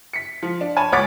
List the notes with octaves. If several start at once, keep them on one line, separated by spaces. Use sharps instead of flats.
B6 C#7
F3
D4
C#5 G#5 A5 B5
C#2 C#5 F#5 D6 A6 B6